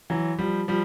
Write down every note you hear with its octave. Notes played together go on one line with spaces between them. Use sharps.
E3 F#3
F3 G3
F3 G3